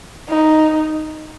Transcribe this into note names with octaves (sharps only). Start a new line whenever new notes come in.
D#4